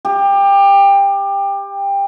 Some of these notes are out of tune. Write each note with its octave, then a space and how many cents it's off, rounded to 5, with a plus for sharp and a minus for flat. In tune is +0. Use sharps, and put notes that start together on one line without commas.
G4 +20